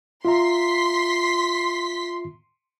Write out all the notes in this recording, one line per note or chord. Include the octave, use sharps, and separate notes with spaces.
F4 E5 A#5 C6 B6